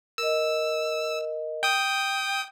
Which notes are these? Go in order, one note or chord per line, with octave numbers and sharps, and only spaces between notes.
A#4 D#5 E6
G5 D#6